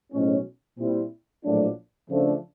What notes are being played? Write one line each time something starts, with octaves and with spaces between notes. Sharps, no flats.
B1 A2 F3 G#3 C#4
A#2 G3 C4 E4
A#1 A2 F#3 A3 D4
C#3 F3 A3 D4